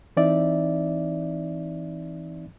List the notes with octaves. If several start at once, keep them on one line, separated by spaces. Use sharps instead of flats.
E3 C4 D#4 D5 E5